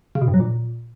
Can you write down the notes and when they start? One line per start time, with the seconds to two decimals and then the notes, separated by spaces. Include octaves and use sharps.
0.15 C#3
0.21 B2
0.28 G2
0.34 F#3
0.40 A#2